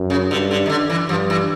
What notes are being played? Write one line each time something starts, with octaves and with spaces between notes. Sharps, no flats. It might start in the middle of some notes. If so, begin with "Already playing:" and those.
Already playing: F#2
C#3
G2 D3
D3
D#3
D3
E3
G2 F3
E3